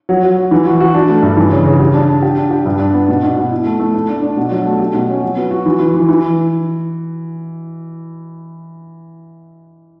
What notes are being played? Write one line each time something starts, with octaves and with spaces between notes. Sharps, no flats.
F#3
F#3
F#3
E3
F#4
F#4
D4
A3
G2
E3
C#3
C#3
G3
D4
D4
G4
D4
G4
G2
D4
B3
B2
B2
B2
E4
A3
A3
A3
D4
D4
B2
F#3
A3
G4
B2
C#4
F#3
B3
F#4
E3
E3
E3
E3